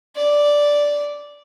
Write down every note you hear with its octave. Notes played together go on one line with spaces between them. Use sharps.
D5